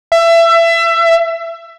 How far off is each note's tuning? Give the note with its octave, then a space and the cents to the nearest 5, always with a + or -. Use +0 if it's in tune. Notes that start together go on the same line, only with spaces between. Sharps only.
E5 +25